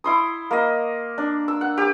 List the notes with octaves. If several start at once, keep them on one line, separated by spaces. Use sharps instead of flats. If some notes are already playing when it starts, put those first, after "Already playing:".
E4 C6 D#6
A#3 D#5
D4
E6
F#5
G4 D6